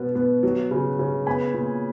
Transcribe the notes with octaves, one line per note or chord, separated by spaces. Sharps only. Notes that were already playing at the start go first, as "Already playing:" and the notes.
Already playing: B2 B3
B3
F#3
C#3
C#3
B3 G#5 B5
A#2